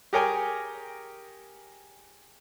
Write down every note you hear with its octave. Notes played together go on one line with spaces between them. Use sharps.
G4 G#4 A#4 C#5 G5 G#5